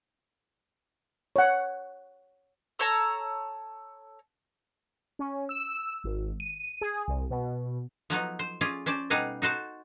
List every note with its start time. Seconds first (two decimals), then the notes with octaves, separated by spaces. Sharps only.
1.36 C#5 F#5
2.79 A4 C#5 A5 A#5
5.19 C#4
5.49 E6
6.04 G#1
6.40 D#7
6.81 G#4
7.08 C2
7.30 B2
8.10 F3 F#3 B3 D#4
8.39 C5
8.61 C#4 F4 G#4 D5
8.86 C#4 C5 D5 A5
9.10 B2 G3 D#4 F5 F#5 G#5
9.42 D#4 F#4 C5 A5